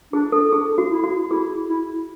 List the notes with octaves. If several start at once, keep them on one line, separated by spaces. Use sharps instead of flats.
D4 G#4
A4
D4 G#4
F#4
E4
F#4
E4 G#4
E4